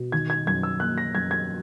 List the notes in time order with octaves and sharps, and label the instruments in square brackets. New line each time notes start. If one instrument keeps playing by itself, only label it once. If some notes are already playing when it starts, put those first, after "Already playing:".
Already playing: [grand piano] B2
D#3 G#6
G#6
F#2 G#6
E6
A#3 F#6
A#6
F#2 G#6
G#6